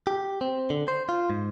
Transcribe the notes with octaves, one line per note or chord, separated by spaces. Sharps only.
G4
C4
D3
C5
F4
G#2